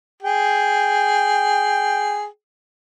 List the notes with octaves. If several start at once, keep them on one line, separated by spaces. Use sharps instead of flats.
G#4 G5